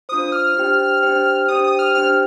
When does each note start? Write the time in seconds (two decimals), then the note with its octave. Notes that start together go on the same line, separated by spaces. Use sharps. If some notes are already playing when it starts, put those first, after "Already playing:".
0.09 D4 F4 C5 D#6
0.32 F6
0.55 D4 G4 C5 G5
1.02 D4 G4 C5 G5
1.48 D4 G4 C5 G5 D#6
1.64 D#6
1.79 F6
1.95 D4 G4 C5 G5 F6